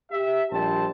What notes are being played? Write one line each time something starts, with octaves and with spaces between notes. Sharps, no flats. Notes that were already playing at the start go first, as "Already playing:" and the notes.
G4 E5
A#1 G3 C4 A5